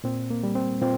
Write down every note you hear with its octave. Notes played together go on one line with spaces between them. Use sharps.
A#2 C4
A#3
G3
C4
A#2 C4 F4